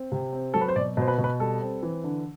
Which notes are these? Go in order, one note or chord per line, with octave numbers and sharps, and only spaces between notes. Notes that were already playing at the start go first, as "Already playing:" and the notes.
Already playing: C4
C3
C4
F#3 A4
B4
C5
B2 D5
B2 C5
B4
B2
B4
G3 A4
C4
E3
D3